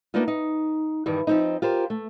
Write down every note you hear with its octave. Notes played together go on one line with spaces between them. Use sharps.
A#3 B3 D4 D#4 F4
D#4
G2 D#3 E3 G3
F3 C4 D#4
F4 G4 A#4 C5
A3